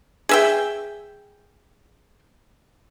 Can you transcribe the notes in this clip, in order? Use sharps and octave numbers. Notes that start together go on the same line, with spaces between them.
G#4 E5 G5